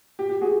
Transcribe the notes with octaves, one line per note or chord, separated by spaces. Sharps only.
G4
G4
F#4 G#4